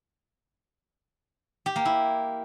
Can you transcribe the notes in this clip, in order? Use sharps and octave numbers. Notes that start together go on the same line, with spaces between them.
G4
A#3
E4